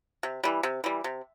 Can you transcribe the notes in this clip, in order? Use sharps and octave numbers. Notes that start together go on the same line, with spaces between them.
C3
E3 G3
C3
E3 G3
C3